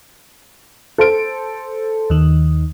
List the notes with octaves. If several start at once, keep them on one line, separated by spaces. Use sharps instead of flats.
A4 C5 D7
D#2 D#3